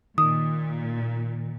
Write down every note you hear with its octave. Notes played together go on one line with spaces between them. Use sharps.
A#2 D#3 D#6